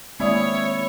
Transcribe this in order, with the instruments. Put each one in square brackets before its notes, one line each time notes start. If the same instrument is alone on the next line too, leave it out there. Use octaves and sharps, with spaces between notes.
[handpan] D#3 A#3 C4 [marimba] G#3 D5 D#6 [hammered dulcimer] E4 [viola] C#5